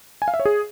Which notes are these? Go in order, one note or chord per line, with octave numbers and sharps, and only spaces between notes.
G#5
F5
E5
C#5
G#4